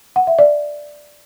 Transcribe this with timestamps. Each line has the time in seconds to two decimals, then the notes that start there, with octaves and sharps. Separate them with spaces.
0.16 F#5
0.27 E5
0.39 D5